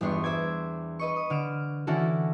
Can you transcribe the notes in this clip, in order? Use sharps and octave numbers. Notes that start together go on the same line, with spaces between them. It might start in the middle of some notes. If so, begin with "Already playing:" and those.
G1 E2 B3 D4 C6 C#6
C5 E5 D6 G#6
B4 D#5 C#6
D#6
D3 F6 D7 E7
D3 E3 C#4 E4 F#4 A4